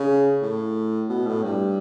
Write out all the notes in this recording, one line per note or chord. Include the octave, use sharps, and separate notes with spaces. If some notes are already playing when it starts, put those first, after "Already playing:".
Already playing: C#3
A2
B2
A2
G2